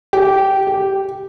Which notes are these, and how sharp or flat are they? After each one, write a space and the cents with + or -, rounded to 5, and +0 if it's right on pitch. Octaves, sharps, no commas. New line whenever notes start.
G4 -15
G4 -5